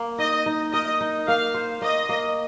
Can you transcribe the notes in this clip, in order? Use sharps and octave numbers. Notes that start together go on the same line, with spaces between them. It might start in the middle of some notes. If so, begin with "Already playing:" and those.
Already playing: A#3
D#4 D#5
D#4
A#4 D#5
D#4
A#3 F5
C5
A#3 D#5
A#3